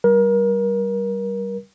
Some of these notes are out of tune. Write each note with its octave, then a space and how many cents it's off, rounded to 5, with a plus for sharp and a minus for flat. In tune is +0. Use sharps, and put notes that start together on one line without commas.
G3 -15 A#4 +30